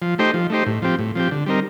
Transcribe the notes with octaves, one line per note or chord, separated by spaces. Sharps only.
F3
A3 D#4 G4 C5
F3
A3 D#4 G4 C5
A2
F3 C4 G4
A2
F3 C4 G4
D3
G3 C4 D#4 A#4